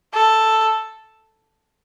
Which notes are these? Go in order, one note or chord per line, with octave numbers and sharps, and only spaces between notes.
A4